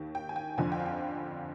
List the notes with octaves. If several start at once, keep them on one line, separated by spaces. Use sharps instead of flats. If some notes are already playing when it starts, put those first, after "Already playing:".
Already playing: D#2 D#3
G5
G#5
G5
F2 D3 F3 G#5
G5
F5
G5